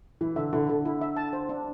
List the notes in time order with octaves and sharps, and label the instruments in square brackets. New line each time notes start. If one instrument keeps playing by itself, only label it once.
[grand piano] E3 [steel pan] E4
[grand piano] D3 [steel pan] E5
[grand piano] D3 [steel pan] E4
[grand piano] D3 [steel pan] A4
[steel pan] E4
E5
A5
C5
D4